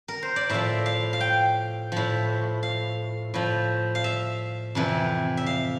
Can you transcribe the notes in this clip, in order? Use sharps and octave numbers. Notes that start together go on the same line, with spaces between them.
A#4
C5
D5
A2 F3 E5
F5
F5
G5
A2 F3
F5
A2 F3
F5
E5
F2 C3 E3
E5
F5